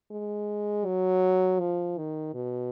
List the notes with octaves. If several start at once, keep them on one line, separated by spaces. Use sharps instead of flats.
G#3
F#3
F3
D#3
B2